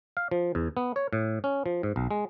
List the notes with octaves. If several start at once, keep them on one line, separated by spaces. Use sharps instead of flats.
F5
F3
E2
B3
C#5
A2
C#4
F3
G#2
B1
G#3